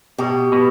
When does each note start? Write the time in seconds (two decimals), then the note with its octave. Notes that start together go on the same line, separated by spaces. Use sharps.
0.19 B2 G4
0.52 B2